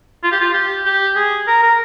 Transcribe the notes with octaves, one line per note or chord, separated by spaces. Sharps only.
F4
G4
F4
G4
G4
G#4
A#4
A#4